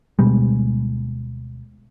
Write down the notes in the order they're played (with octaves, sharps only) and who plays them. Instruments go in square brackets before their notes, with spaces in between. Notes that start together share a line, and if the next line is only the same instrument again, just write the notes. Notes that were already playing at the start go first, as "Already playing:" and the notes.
[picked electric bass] D2 B2 G3 G#3